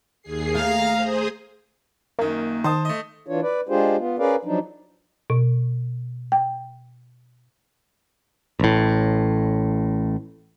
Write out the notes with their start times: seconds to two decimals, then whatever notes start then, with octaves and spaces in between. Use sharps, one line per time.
0.22 D#2 G#4 C7
0.55 A3 F5 A#5
0.95 G#4 C5 D#6
2.19 F#2 D#3 A#3
2.64 D#3 C5 A5 D#6
2.85 A3 D#5
3.27 E3 D4 F4 C#5
3.42 B4 D5
3.69 G#3 D4 F4 G4 G#4 C5
3.98 B3 F4
4.19 C#4 G#4 A#4 B4 D5 F5
4.45 F3 F#3 D4 D#4
5.30 B2
6.32 G5
8.60 A1 A2